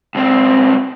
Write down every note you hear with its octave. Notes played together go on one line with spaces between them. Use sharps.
C#2 C4